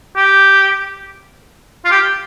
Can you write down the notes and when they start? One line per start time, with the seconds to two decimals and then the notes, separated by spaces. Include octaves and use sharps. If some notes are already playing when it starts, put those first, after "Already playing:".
0.16 G4
1.85 F4
1.91 G4